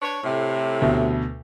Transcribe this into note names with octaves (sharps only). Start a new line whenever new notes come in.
D4 B4 C#5
A2 C3
D2 B2